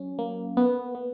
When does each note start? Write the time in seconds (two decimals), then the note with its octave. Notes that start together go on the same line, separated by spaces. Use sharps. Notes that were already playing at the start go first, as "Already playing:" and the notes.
Already playing: F#3 C#4
0.19 A#3
0.57 B3
0.95 B3